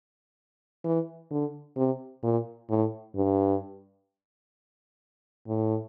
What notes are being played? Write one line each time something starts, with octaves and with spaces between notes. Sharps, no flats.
E3
D3
C3
A#2
A2
G2
A2